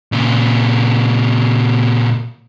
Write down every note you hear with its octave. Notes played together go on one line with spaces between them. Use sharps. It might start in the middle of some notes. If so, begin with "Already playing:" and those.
A#2 C#3